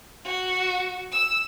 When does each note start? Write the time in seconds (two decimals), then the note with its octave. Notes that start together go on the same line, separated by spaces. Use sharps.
0.25 F#4
1.11 E6